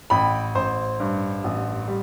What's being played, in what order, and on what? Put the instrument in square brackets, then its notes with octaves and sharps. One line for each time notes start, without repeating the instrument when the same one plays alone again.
[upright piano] A1 G5 B5
A1 C5
G2
A1
G3